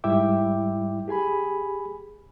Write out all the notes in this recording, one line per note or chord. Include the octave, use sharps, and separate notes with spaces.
G#2 G3 E4 E5 G5 D6
G4 G#4 G#5 B5